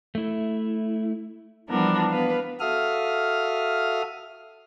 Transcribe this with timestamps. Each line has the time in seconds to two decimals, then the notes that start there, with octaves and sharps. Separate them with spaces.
0.15 A3 E4
1.68 E3 F3 G3 B3 D4 A#4
2.10 B3 B4 F5
2.60 F#4 A4 E5 F5 D#6 F6